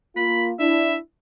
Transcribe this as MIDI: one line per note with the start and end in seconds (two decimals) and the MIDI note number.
0.16 0.53 58
0.16 0.53 65
0.16 0.46 83
0.59 0.97 62
0.59 0.97 64
0.59 0.95 76